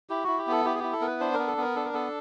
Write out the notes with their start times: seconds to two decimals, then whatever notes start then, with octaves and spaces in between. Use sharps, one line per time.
0.09 E4 G4
0.24 E4 F#4
0.38 G4
0.47 B3 A4
0.65 E4 G4
0.75 G#4
0.79 E4 G4
0.93 A4
1.01 B3 A#4
1.07 B4
1.20 D4 C5
1.34 B3 A#4
1.47 A4
1.57 B3 A#4
1.76 D4 A4
1.85 A#4
1.93 B3 A4